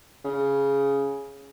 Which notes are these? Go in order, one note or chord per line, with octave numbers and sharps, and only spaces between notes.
C#3